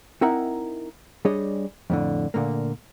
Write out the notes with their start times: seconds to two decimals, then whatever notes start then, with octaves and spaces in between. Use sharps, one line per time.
0.21 C4 D#4 E4 A#4 E5 F#5
1.25 G3 D4 G#4 C#5 D#5
1.90 F2 A2 D3
2.34 A#2 D3 A3 A#3